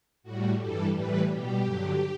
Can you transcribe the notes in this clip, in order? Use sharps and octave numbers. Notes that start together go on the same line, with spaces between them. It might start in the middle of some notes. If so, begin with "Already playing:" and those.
A2 G3 F#4
G2 E3 G3 A4
A2 E3 G3 B4
B2 G3 G4
G2 D3 F#3